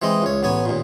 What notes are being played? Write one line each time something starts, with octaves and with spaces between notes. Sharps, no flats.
E3 G#3 C4 D#5
C#2 C#5
A1 B3 C#5 G#5
D#2 A#2